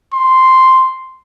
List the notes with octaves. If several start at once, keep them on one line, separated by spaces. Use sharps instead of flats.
C6